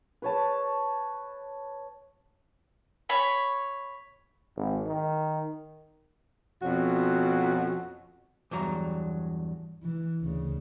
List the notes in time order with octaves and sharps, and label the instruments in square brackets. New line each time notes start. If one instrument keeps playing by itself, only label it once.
[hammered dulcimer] B4 C#5 A5
[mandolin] C#5 B5
[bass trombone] G#1
D#3
[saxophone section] F2 B2 C#4 F#4
[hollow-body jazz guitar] E2 G2 F#3 A#5
[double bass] E3
D2 C#3